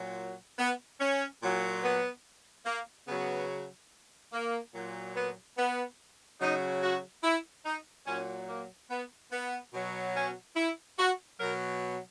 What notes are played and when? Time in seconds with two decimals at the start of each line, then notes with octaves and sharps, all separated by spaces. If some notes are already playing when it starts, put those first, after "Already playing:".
Already playing: A#2 F#3
0.58 B3
1.00 C#4
1.41 A#2 F#3
1.83 B3
2.66 A#3
3.08 C#3 F#3 B3
4.33 A#3
4.74 A#2 F#3
5.16 B3
5.57 B3
6.41 C#3 F#3 D#4
6.82 F#4
7.24 E4
7.65 D#4
8.07 A#2 F#3 C#4
8.49 A#3
8.90 B3
9.32 B3
9.73 B2 F#3
10.16 C#4
10.56 E4
10.98 F#4
11.40 B2 F#3 A#4